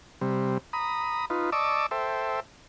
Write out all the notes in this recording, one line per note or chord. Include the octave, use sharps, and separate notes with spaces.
C3 G3
A#5 B5 D#6
D#4 F4 B4
D5 D#5 A5 C#6 D6 E6
A4 C5 E5 G5